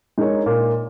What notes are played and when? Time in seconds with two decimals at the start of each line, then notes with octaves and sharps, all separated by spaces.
0.18 G#3 D#4 A#4 C#5
0.46 A#2